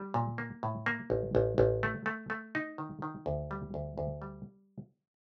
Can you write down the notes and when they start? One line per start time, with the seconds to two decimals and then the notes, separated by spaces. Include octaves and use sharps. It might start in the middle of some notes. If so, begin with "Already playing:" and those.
Already playing: G3
0.14 A#2
0.38 A#3
0.63 A2
0.86 A#3
1.10 A1
1.35 A1
1.58 A1
1.83 A3
2.06 A3
2.30 A3
2.55 D#4
2.78 D#3
3.02 D#3
3.26 D2
3.51 G3
3.74 D2
3.98 D2
4.22 G3